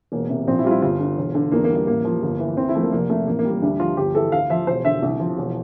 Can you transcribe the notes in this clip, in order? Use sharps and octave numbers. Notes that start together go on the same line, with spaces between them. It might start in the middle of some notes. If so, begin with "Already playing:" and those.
E1 A#3
C3
A#1 C4
E4
G3 F4
E4
G1 F4
D3
E1
D3
E2 A#3
A#3
G3
A#3
A1 A#3
F3
G1
E3
D2 C4
E4
F3 A3
A#3
F1 A#3
C3 A3
A1 A#3
A#3
G3
A#3
D2 D4
F3 F4
G1 G4
E3 A4
D2 F5
F3 E5
E1 C5
D3 E5
C2
F3
E1